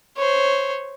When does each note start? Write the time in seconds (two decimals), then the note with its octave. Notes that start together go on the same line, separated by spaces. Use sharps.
0.17 C5 C#5